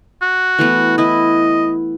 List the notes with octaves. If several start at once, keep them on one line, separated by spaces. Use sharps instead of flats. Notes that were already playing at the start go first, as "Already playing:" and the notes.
F#4
E3 A3 B3
E4 B4 D#5